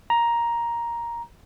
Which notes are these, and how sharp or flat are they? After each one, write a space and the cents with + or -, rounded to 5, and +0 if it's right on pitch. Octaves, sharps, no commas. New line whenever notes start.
A#5 +10